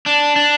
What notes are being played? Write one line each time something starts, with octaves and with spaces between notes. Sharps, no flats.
D4
D4